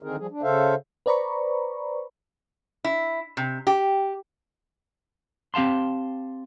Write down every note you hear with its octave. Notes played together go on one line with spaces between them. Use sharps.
D3 D#3 C4 D#4 G#4 A#4
F3 G3 G#4
D4
C#3 A4 C5 E5 F5
B4 C5 D5 A#5 B5 C#6
E4
C3
G4
C4 G4 F5 A5 C6